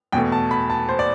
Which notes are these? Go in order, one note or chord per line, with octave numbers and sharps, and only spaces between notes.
E2 B2 A3 G5
A5
B5
A5
C5
D5